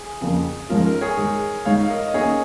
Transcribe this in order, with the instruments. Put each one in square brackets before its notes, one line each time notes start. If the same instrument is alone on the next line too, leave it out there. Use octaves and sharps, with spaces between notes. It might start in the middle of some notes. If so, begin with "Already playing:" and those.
Already playing: [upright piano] G#4
[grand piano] F2 C#3 F3 A#3
[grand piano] G#2 F3 C#4 F4 [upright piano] A#4
[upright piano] A#4
G#4 C#5
[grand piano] G#2 D#3 G#3 D#4
[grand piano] G#2 G#3 D#4 [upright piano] C#5 F5
[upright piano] F5
A#4 D#5
D#5
[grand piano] D#3 A#3 C#4 [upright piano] G#4 C#5